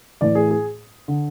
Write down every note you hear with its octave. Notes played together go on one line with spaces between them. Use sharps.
A2 E3 D5
G#4
G#4
D3